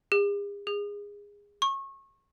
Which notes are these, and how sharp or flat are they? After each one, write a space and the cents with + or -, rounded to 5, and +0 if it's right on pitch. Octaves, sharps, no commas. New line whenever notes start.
G#4 -45
G#4 -20
C#6 -30